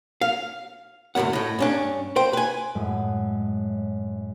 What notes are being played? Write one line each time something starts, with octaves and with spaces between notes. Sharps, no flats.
F5
C#2 F#2 A2 A#3 F#5
A2 D#5
G2 C#4 D4
C5 G5
B4 G#5
F#2 A2 G#3 A3